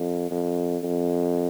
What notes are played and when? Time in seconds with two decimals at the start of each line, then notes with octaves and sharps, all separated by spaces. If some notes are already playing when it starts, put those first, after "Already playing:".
Already playing: F2
0.31 F2
0.84 F2